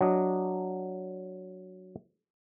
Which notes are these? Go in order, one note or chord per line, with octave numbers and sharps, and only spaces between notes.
F#3 D4 D#5